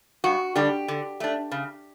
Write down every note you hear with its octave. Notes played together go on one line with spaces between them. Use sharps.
G2 F#4
D3 G3 D4 G4
D3
A3 D4
C#3